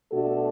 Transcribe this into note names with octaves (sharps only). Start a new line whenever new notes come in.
B2 A3 D4 F#4 A4